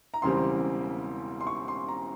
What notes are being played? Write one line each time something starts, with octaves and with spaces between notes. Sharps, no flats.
A#5
E1 E2 C#3 G3 C4 C6
C6
C#6
C6
A#5